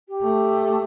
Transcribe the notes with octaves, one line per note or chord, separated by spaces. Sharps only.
G4
A3